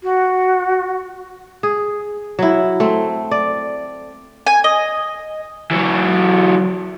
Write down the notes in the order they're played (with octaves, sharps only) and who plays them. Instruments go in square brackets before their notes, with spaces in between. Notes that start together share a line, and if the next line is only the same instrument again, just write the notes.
[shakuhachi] F#4
[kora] G#4
F#3 E4
A3 C4
D5
[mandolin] G#5
D#5
[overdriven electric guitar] E3 F#3